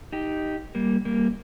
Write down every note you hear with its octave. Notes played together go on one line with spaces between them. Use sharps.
D#4 G4
G3 A#3
G3 A#3